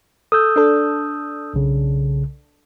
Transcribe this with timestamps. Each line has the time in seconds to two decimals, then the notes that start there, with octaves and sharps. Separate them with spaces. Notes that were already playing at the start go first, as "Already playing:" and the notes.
0.32 A4 D#6 E6 G6
0.56 D4 A4
1.54 B1 C#3